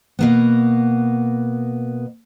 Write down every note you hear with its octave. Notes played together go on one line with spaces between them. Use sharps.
B2 A#3 B3